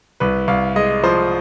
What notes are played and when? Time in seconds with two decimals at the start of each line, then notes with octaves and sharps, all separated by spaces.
0.20 C2 B4
0.48 C2 F5
0.76 G#3 D#5
1.04 F3 C5